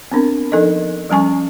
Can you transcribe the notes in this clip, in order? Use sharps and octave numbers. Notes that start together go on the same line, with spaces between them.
B3 C4 D4 A#4
F3 D#4 A4 A#4 D#5
F3 G3 C#4 G#5 C#6